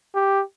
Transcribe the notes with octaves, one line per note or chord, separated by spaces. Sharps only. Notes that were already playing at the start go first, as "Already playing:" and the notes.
G4